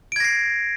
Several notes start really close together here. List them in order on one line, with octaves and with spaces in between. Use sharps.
D7 G#6 A#6 C7